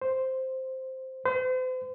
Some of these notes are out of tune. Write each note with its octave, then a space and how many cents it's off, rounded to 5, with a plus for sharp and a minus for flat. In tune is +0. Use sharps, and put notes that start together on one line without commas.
C5 +0
C5 -40